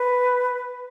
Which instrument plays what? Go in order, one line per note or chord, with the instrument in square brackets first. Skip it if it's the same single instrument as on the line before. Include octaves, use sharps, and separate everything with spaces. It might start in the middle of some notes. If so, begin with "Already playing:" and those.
Already playing: [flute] B4